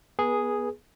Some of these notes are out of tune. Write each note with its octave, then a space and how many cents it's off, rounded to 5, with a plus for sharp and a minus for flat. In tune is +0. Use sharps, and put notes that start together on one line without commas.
B3 -20 G#4 +0 B4 -30